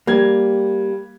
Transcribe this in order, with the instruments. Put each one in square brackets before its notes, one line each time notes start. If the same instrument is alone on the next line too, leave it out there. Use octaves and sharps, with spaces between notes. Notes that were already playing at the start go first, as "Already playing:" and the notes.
[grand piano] G3 G#6 [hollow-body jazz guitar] A#3